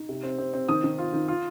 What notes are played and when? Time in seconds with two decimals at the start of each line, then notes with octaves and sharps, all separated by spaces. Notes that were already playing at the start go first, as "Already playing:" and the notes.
Already playing: D#4
0.09 C3
0.23 C4
0.38 C4
0.54 C4
0.69 D#3 D#6
0.84 D#3
0.99 F4
1.14 D#3
1.28 F4